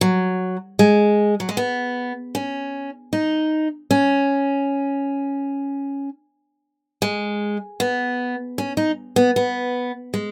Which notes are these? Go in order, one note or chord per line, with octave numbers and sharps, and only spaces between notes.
F#3
G#3
F#3
G#3
B3
C#4
D#4
C#4
G#3
B3
C#4
D#4
B3
B3
G#3